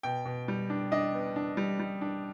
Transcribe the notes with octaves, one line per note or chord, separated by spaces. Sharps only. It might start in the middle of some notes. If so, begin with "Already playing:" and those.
B2 G5
B2
G3
D4
D4 D#5
B3
D4
G3
G3
D4